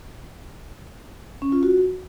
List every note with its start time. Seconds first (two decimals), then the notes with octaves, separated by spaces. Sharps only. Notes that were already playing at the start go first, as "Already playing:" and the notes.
1.42 C#4
1.52 F4
1.63 F#4